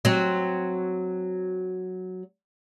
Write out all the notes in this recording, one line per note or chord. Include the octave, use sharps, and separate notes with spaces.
F#3 C4